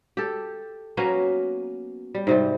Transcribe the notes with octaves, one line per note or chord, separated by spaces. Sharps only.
G4 A4
F#3 A#3 B3 C#4
G3
G#2 C3 G3